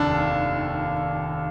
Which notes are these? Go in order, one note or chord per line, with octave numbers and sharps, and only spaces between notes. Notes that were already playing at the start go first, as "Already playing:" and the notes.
Already playing: F1 D#2 D4